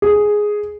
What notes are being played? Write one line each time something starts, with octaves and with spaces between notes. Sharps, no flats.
G#4